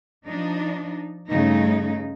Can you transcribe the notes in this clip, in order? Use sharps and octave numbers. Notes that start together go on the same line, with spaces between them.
F3 D4 D#4
G2 C#3 A3 D#4